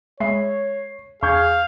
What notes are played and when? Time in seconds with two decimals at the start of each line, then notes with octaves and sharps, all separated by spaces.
0.20 G#3 C#5 E5 B5 C7
1.23 E2 G#4 F5 C#6 G6 G#6